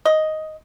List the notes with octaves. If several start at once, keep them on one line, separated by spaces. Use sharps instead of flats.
D#5